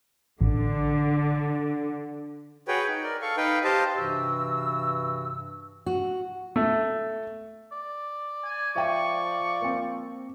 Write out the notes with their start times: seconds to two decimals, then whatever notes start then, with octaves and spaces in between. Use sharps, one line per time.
0.41 A1 D3
2.68 F#4 G#4 B4 C#5 G5
2.88 D#4
3.03 A#4 D5
3.22 A4 F5 C#6
3.37 D#4 B4 F5 G5
3.64 G4 C5 D#5 F5 A5
3.97 G2 C3 E3 F#4 E6
5.86 F#4
6.56 A3
7.72 D5
8.44 G#5
8.76 F3 E5 G5 C#6 D#7
9.61 A#3 C4